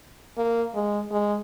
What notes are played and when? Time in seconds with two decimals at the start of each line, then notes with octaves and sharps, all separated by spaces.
0.37 A#3
0.75 G#3
1.11 G#3